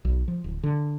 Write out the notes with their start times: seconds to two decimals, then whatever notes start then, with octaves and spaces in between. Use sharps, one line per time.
0.05 B1
0.28 F3
0.44 D1
0.63 D3